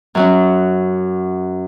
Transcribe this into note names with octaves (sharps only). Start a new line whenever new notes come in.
F#2 F#3 C#4